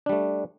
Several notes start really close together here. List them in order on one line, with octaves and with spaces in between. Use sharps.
D4 G3 A3